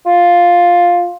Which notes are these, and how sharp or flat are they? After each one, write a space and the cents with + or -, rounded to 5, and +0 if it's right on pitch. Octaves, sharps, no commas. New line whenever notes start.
F4 +5